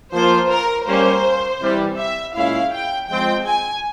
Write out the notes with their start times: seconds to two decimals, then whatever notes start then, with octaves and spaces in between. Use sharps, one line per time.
0.13 F3 A#3 F4 C5
0.50 A#4
0.86 G3 A#3 C#4 C5
1.61 C3 E3 G3
1.97 E5
2.35 A#2 G#3 C#4 E4 F5
2.72 G5
3.09 F3 G#3 C4 G5
3.46 G#5